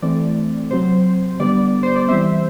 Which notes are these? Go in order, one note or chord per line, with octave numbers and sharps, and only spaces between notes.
E3 A3 C4 D5
C3 F#3 C4 C5
D3 G3 B3 D5
C5
D5
E3 G3 C4 C5 E5